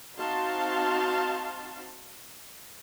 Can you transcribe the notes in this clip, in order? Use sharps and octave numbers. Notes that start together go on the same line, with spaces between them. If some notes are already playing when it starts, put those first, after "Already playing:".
C4 D#4 F#4 F5 A5 C6